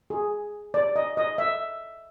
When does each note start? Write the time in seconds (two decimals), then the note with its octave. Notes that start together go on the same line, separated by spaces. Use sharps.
0.10 G#4
0.74 D5
0.96 D#5
1.17 D#5
1.38 E5